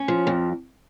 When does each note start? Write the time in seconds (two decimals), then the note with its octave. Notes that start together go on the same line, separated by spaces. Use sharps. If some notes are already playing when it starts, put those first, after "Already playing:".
Already playing: C#4
0.08 F3
0.27 F2